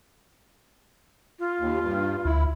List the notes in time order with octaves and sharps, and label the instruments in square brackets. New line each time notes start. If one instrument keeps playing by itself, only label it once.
[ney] F4
[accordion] D#2
G2
[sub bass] D2 [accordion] E4